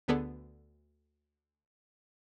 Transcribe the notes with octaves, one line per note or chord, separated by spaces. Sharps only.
D2 D3 B3 G#4 A4 D5